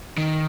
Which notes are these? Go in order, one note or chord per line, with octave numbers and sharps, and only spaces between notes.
D#3